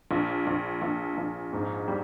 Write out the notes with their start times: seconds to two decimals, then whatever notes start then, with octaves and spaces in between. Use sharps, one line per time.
0.11 A#1
0.47 A#1
0.82 A#1
1.18 A#1
1.53 G#2
1.88 G3